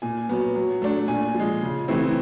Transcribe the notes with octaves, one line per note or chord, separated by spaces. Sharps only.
A#2 G#5
F#3 B3
F#3
A3 D4
A#2 G#5
F3
G#3
C#3
E3 A3 C4 E4